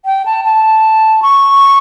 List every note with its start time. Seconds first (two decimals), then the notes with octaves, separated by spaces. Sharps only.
0.05 G5
0.26 A5
0.45 A5
1.22 C#6